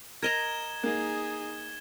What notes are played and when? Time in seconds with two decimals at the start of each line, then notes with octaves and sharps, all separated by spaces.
0.23 A#4 D#5 A#5 G#6 E7 G7
0.83 A#3 D#4 G#4